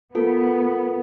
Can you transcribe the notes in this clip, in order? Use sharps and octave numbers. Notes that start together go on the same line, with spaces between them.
B3 F4 A4 A#4